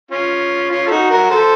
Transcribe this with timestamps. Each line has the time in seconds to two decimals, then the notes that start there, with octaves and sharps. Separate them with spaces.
0.11 C#4 F4
0.71 C#4 F4
0.87 A4
0.90 D#4 F#4
1.11 F#4 A#4
1.31 A4 C5